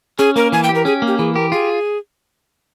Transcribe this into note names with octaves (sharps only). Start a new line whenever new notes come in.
C#4 G#4
A#3 A#4
E3 G#5
G5
G4
A#4
C#4 G#4
A#3
G4
E3 G#4
G4 A#4
F4 G#4